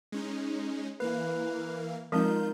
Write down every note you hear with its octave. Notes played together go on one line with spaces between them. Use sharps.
G#3 C#4 D#4
E3 A#3 B4 F5
F3 G#3 C4 D#4 F4 A#4 G6